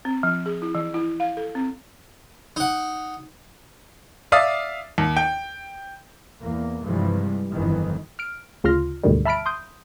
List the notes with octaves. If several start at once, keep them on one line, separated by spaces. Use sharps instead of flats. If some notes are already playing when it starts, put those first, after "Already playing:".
C4
F3
G#4
E4
E3
E4
F5
A4
C4
D#4 F#5
D5 E5 F5 D#6
D#2
G5
E2 A#3
G2 C3 E3 F3 G3 G#3
G1 F2 D#3 E3
F6 D7
D2 C#3 F4 C6 F6 A#6
D2 G#2 B2 D3 D#3 G3
E5 A5 B5 F6 B6 D7
C6 D#6 G6